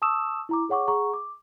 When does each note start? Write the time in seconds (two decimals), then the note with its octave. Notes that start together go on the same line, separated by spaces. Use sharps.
0.02 A5 C#6 D#6 E6 E7
0.49 E4 A#5 D6
0.69 G#4 C#5 F#5 C#6 D6
0.88 G#4 F#5 A#5 C#6
1.13 D6